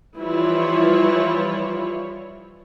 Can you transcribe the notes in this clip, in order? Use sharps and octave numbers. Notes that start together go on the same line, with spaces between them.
E3 F3 G3 E4 F4 C#5